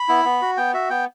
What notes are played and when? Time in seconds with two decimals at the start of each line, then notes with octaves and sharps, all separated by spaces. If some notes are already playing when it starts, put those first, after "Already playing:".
Already playing: B5
0.08 B3 E4
0.25 B3
0.42 F#4
0.57 B3 G5
0.74 F#4 E5
0.90 B3 G5